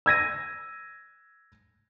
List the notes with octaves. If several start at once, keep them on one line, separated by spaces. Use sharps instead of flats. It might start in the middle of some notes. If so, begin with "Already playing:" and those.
E6 G#6 A#6 D#7